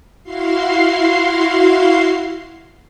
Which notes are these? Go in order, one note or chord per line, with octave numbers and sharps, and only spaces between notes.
E4 F#4 F5 C6 C7